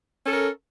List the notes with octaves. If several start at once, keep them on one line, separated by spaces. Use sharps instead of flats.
C#4 A4 A#4